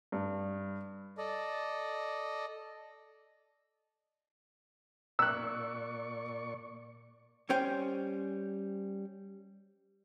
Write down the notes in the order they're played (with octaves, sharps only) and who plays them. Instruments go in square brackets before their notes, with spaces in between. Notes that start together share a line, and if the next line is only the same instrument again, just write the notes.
[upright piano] G2
[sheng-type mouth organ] A4 D5 D#5
[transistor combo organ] A#2 D5 C#6 [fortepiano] E6 F#6
[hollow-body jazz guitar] G3 C#4 C5 G5